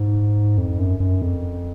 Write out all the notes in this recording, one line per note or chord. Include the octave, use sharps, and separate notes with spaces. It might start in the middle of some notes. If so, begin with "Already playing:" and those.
Already playing: G#2
F2
F#2
F#2
F2